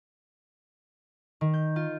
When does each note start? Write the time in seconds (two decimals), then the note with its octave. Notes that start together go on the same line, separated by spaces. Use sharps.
1.41 D#3
1.54 G6
1.76 F4